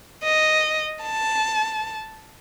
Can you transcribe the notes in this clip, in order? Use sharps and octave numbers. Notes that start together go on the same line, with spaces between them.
D#5
A5